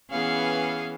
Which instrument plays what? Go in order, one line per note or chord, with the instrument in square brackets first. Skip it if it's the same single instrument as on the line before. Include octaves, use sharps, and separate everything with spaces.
[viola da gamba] E3 B3 C#4 [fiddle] G#4 F5